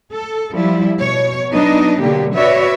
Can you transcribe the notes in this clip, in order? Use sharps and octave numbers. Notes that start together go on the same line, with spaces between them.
A4
F3 G3 E4
B2 C#5
F#3 B3 D4 D#4 D#5
B2 D3 F#3 G3 A#3 G4
F#4 B4 C#5 D5 E5